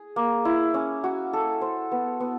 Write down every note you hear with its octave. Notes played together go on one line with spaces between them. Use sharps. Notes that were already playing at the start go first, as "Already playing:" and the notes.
Already playing: G#4
A#3
E4
C#4
F#4
A4
C5
B3
B3